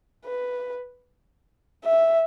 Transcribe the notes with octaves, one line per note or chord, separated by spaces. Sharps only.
B4
E5